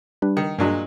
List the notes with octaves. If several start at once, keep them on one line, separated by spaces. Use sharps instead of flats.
G3 D4 B4
D#3 C#7
G2 A#2 F#3 G#3 D4